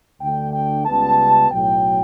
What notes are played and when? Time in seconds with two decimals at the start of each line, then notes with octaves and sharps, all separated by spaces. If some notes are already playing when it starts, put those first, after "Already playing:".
0.21 D2 D3 A3 D4 G5
0.54 G5
0.86 C#2 C#3 G3 B3 A5
1.51 B1 A2 F#3 G5